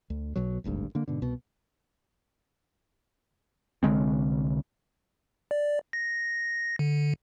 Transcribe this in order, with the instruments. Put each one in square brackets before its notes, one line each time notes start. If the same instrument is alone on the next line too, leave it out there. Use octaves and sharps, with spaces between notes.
[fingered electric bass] D2
B1 B2 F#3
D#1 G#1 D2 G2
D3 A#3
G#2 B2 D3
C2 B2
[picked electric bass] C2 D3 G#3 C4
[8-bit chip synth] D5
A#6
D3